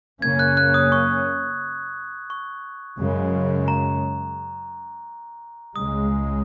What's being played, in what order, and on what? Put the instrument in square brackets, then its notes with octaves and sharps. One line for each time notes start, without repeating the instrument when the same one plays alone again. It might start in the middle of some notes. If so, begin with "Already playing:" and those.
[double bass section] F#2 C#3 A#3 C#4 [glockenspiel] G#6
[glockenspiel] F#6
F#6
D#6
C#6
C#6
[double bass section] F#2 C#3 G#3
[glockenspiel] A#5
[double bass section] C#2 C#3 G#3 [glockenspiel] D#6